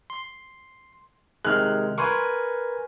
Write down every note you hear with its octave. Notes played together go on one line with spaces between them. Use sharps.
C6
C3 D#3 G#3 F6 F#6
A#4 B4 G#5 C6 C#6